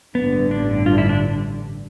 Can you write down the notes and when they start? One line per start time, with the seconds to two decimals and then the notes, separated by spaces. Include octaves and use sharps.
0.15 A1 G2 D3 B3
0.51 D4
0.86 F4
0.98 E4
1.09 D4